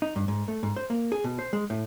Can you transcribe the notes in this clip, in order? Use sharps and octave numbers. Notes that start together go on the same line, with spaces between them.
D#4
G2
G#2
A3
G#2
C5
A#3
G#4
B2
C5
G#3
A2